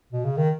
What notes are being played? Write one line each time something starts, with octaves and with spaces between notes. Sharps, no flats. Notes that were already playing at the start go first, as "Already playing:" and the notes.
B2
C#3
D#3